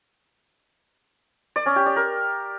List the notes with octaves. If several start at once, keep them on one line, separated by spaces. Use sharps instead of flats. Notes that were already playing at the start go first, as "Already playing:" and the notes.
D5
C#4
G4
D5
A#4